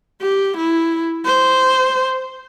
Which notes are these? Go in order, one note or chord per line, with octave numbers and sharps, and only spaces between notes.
G4
E4
C5